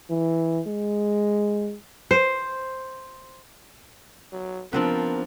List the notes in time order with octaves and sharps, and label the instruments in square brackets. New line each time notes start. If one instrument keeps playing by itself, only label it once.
[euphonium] E3
G#3
[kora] C5
[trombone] F#3
[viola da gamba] F3 [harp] B3 C4 D4 [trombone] A#4